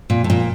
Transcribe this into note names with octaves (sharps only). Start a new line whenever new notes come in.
A#2
A2
A#2